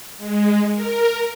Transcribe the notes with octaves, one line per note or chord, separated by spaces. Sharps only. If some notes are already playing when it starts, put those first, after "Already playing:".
G#3
A#4